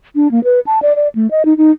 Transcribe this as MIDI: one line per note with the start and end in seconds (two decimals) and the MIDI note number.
0.15 0.31 62
0.31 0.43 58
0.44 0.60 71
0.67 0.79 81
0.82 0.93 74
0.96 1.08 74
1.15 1.30 57
1.31 1.43 75
1.45 1.56 63
1.57 1.71 63